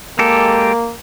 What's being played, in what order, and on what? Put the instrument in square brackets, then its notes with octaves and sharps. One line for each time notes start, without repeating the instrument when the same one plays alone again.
[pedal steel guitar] G#3 G4 A4 [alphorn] A#3